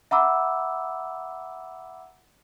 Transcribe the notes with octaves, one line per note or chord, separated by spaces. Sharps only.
E5 F#5 A#5 B5 D6 E6